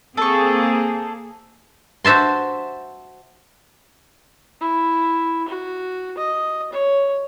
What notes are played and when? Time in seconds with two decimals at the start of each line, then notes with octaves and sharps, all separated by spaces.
0.17 A#3 C4 G#4 A4 C#6
2.05 F#4 C5 E5 A5 C6
4.61 E4
5.48 F#4
6.18 D#5
6.72 C#5